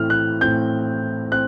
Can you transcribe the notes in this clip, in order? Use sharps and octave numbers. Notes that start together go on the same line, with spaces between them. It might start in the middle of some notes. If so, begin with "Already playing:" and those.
Already playing: A2 E3 A3 C4 F6
F#6
A2 E3 A3 C4 G6
C4 F#6